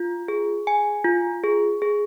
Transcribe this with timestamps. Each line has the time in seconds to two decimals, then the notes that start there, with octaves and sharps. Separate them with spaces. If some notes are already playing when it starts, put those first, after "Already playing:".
Already playing: F4
0.28 G#4
0.67 G#5
1.04 F4
1.44 G#4
1.82 G#4